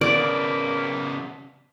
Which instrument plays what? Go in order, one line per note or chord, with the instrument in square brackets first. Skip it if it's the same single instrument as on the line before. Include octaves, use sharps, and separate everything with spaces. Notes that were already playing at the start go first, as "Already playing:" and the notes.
[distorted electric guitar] C#3 B3 [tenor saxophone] A#3 [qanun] D5